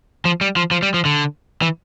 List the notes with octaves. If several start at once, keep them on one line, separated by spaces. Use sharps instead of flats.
F3
G3
F3
F3
G3
F3
D3
E3